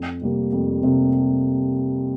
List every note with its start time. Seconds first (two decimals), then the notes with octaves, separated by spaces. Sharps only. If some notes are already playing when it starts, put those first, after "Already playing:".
Already playing: F2
0.21 C3 G3 A#3
0.53 F2
0.83 C3 G3 A#3